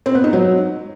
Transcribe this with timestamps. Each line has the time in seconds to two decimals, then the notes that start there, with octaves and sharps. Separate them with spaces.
0.06 C4
0.15 B3
0.24 D#4
0.33 F#3